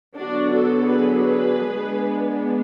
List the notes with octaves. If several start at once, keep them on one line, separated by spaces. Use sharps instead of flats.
D3 F#3 B3 D4 F#4
F#4 A4
G#4 B4
G#3 B3 D4